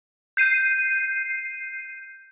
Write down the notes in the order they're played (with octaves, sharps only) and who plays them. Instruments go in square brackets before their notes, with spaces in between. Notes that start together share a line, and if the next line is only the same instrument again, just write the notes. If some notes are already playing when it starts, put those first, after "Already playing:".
[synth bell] G6 C7 D#7